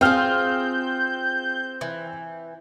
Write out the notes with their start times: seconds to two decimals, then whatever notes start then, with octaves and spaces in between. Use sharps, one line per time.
0.01 C4 F4 G#4 F6 G6
1.81 E3